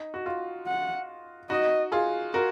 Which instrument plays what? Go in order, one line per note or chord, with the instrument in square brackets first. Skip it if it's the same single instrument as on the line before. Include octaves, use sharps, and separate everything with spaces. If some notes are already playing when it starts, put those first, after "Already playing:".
Already playing: [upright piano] D#4
F#4
F4
[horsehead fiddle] F#5
[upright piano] D#4 F#4 [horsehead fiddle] D#5
[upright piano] F4 G#4
F#4 A#4